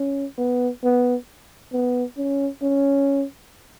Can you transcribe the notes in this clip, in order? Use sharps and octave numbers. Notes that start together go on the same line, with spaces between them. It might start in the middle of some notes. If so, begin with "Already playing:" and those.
Already playing: C#4
B3
B3
B3
C#4
C#4